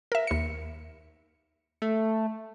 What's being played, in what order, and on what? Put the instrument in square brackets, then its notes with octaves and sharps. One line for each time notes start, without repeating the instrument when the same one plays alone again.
[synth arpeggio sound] A#4 E5
D#2 C#7
[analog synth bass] A3